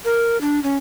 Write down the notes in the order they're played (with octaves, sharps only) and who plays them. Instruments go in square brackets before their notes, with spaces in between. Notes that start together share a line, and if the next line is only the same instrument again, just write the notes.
[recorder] A#4
D4
C#4